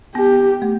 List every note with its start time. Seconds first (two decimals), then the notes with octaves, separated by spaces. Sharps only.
0.15 B3 G4
0.62 A3